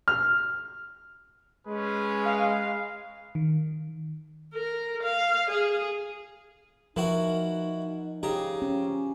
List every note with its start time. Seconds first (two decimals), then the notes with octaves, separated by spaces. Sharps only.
0.08 F6
1.67 G#3 C#4 G#4 B4
2.25 F5
3.35 D#3
4.54 A#4
5.03 F5
5.50 G#4
6.96 E3 F3 D#4 F#4 A#4
8.23 C#3 F3 G4 A#5
8.62 C#4